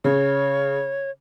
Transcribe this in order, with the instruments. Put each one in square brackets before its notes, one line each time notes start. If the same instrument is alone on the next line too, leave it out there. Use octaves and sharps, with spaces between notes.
[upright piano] C#3 [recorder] C#5